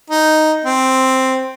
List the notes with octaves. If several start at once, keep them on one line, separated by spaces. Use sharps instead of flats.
D#4
C4